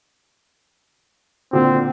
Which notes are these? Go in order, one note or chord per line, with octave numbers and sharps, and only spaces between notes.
A#2 D3 C4